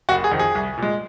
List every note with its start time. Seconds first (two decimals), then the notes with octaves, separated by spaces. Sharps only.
0.09 F#1 F#4
0.24 G#4
0.31 F2 D#3
0.39 G#4
0.55 C2
0.78 A#2 G#3